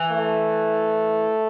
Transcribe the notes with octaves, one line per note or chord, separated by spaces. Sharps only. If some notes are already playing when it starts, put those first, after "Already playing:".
Already playing: E3
A3